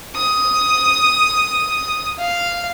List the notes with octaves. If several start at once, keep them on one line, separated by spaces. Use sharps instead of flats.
D#6
F5